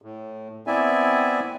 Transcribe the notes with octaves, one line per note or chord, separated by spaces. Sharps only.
A2
B3 C4 E4 D5 E5 G#5